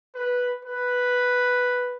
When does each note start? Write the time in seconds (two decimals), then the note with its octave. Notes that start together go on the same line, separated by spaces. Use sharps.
0.15 B4
0.65 B4